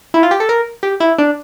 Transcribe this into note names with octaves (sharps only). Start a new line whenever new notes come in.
E4
F4
G4
A4
A#4
G4
E4
D4